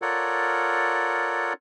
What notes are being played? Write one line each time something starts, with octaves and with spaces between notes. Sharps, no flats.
F4 A4 A#4 C#5 D5 F#5